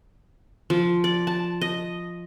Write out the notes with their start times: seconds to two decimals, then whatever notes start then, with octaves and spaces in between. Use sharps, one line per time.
0.70 F3
1.04 D5
1.27 A5
1.61 D#5